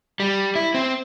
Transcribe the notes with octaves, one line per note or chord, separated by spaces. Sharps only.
G3
E4
C4